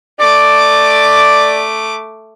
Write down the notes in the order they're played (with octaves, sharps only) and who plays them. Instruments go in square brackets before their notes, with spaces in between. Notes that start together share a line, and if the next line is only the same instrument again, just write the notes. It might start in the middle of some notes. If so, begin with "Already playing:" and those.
[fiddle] A3 D6 [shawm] D5